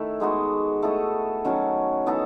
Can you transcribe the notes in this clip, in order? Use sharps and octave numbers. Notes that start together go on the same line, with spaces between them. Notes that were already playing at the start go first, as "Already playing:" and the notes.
Already playing: D#3 A3 E4
G#3 B3 D#4 F#4
A3 E4 A4 D#5
D#3 F#3 C#4 F#4
E3 B3 D#4 A4